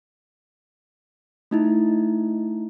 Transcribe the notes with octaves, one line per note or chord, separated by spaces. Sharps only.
A3 D#4 E4